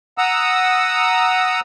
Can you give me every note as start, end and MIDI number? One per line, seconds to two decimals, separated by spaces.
0.18 1.60 78
0.18 1.60 82
0.18 1.60 87
0.18 1.60 88